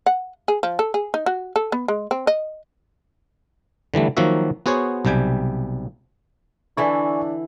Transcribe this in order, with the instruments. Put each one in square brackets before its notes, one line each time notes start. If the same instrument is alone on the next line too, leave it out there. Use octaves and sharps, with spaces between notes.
[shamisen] F#5
G#4
F3
A4
G#4
D#4
F#4
A4
B3
G#3
C4
D#5
[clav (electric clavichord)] D3 E3 G3 A3
D#3 F3 F#3 A#3 F#4 E5
B3 F#4 G#4 C5 C#5
B1 C3 G3 G5 G#5
[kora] D3 E3 E4 [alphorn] D4 [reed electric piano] D5 G#5 C#6